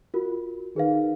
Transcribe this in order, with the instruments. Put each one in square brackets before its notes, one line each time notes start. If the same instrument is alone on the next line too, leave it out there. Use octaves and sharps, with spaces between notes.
[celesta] F4 F#4 A#4
[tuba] D#3 [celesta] G#4 B4 F5